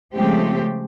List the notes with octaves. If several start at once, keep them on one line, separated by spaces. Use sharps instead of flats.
C#3 F3 G#3 A3 C4 G4